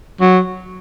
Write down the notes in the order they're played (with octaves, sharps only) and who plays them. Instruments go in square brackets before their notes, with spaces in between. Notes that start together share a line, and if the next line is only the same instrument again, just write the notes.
[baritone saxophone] F#3